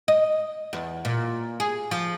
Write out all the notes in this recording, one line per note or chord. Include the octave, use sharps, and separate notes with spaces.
D#5
E2
A#2
G#4
F3